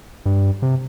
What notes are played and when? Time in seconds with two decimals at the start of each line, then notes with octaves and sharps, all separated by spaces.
0.26 G2
0.62 C3